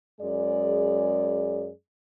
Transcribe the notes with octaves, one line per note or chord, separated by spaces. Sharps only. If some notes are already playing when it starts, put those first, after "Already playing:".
F#2 G#3 G#4 D5